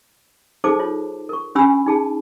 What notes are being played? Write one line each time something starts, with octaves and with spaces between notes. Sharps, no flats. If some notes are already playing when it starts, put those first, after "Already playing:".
D#4 G#4 A4 C5 A5 D6
F4 C#5
A#4 C#6
C#4 D4 G4 G#5 B5 E6
D#4 G#4 A5